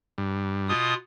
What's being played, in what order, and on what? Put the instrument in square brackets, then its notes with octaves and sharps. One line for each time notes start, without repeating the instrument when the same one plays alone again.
[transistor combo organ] G2
[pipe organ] B2 F4 D#6